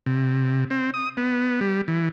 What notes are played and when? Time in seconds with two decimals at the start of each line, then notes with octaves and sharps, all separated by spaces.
0.06 C3
0.70 C4
0.94 D#6
1.17 B3
1.61 G3
1.88 E3